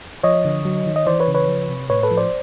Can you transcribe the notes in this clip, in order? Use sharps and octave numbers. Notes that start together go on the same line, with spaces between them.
F3 C#5 D#5
D3
F#3
D#3
D#5
E3 C5 D5
B4 C#5
C#3
B4 C#5
F3
C3
A2 B4 C#5
A4 B4
F3
C5 D5